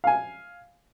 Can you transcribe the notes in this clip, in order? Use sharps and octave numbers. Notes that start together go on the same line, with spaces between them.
F5 G#5